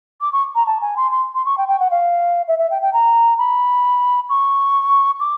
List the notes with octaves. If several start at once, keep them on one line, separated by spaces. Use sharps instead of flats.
D6
C#6
A#5
A5
G#5
C6
C6
C6
C#6
G5
G5
F#5
F5
E5
E5
G5
G5
A#5
B5
C#6
D6